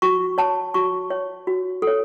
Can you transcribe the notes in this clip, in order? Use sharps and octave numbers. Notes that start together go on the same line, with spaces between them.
F#4 C#6
C#5 A5
F#4 C#6
C#5
F#4
A4
C#5